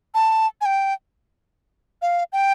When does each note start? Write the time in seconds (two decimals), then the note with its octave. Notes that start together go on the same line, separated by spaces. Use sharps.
0.15 A5
0.61 G#5
0.65 G5
2.02 F5
2.33 G5